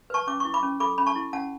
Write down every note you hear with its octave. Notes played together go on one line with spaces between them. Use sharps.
B4 A5 C#6
C#4 D6
E4 C#6
B5 D6
C#4
A4 B5 D6
C#4 B5
A5 C#6
E4
C#4 F#5 A5